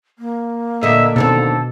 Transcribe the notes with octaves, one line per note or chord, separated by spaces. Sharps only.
A#3
A#2 D3 D#5 E5
D#2 B2 D3 C4 A4